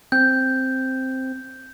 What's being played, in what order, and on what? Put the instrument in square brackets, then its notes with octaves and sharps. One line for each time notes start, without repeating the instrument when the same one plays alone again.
[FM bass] C4 [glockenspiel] G6